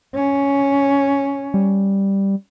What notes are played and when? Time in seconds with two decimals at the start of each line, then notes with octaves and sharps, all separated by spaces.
0.15 C#4
1.54 G3